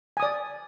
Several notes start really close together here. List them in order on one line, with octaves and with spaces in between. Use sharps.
G#5 D#6 D5